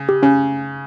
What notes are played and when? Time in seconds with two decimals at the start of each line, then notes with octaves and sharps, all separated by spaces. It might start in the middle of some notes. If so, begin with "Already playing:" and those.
Already playing: C#3
0.09 G4
0.23 C#3 C#4